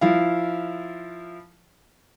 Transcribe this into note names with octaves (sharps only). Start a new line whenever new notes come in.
F3 E4 F5